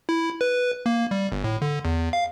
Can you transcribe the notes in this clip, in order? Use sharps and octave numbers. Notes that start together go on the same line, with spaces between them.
E4
B4
A#3
G3
G1
A2
D3
E2
F5